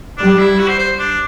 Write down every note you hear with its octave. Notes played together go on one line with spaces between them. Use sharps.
G3 D4
E4
F#4
C5
C5
D4